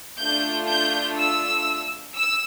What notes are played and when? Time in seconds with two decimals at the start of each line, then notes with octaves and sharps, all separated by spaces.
0.20 A3 D4 F4 A4 G6
0.69 G6
1.19 E6
2.16 E6